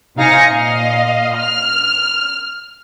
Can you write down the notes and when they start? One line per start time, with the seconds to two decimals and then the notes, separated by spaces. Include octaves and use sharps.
0.16 C3 D#4 F5 G#5 A#6 C#7
0.48 A#2 D#5 F5
1.37 F6